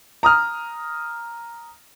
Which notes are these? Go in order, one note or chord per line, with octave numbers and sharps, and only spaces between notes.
A#5 D#6 F6